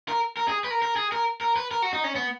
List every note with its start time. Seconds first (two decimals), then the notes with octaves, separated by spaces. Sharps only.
0.08 A#4
0.37 A#4
0.48 G#4
0.64 B4
0.70 A#4
0.82 A#4
0.96 G#4
1.12 A#4
1.41 A#4
1.56 B4
1.71 A#4
1.82 F#4
1.93 D#4
2.04 C#4
2.15 B3